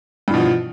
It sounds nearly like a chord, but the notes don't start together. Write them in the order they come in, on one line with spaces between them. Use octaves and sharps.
G2 E3 B2 F3